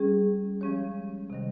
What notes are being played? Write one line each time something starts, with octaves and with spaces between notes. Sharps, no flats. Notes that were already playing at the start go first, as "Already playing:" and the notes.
Already playing: G3 C#4 G#4
F3 G#3 C#4 G4 C#5
C3 D#3 G3